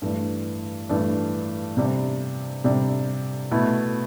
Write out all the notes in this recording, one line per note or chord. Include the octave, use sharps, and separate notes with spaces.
G2 E3 A3 D4
G2 E3 A3 D4
C3 G3 D4
C3 G3 D4
B2 A3 E4